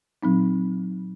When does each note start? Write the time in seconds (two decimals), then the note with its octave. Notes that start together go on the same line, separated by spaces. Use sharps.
0.23 A#2 F#3 C4 D#4